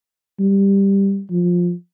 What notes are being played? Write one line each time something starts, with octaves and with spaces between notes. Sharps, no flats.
G3
F3